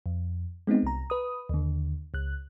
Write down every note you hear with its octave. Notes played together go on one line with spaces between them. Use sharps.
F2
G#3 B3 C4 D#4
C2 A#5
B4 D#6
D#2 D3
C#2 F#6